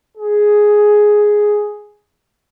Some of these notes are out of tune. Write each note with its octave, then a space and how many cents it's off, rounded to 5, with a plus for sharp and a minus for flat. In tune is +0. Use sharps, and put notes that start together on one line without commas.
G#4 +5